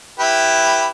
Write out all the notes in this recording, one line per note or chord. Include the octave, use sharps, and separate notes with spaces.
E4 G4 B4